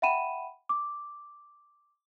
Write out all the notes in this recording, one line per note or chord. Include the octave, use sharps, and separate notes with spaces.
E5 F#5 G5 B5 D#7 E7
D6